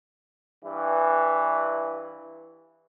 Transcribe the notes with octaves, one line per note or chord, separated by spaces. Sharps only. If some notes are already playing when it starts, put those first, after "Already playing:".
G2 E3